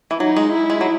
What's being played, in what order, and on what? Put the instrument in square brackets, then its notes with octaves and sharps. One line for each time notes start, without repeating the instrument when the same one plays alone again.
[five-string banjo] E3
[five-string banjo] F#3 [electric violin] D#4
[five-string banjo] G#3
[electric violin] E4
[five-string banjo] G#3
F#3